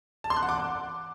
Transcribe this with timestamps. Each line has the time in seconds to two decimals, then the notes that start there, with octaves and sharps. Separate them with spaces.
0.24 A5
0.30 C6
0.36 F#6
0.43 F#5
0.49 D6